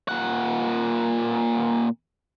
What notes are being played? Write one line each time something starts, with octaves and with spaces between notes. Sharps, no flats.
A#2 F#5